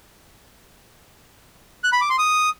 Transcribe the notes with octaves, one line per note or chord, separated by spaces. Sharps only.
F#6
B5
D6
C6
D#6